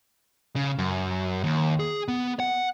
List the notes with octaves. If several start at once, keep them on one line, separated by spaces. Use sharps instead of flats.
C#3
F#2
D#2
G#4
B3
F#5